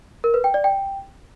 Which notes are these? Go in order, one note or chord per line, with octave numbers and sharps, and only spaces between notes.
A#4
B4
G5
D5
G5